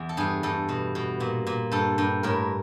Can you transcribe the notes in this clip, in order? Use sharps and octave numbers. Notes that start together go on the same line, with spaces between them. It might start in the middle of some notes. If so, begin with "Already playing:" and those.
Already playing: E2
A4
G2 G#4
G2 A4
B2
B2
A#2
A#2
G2 A4
G2
A2 A#4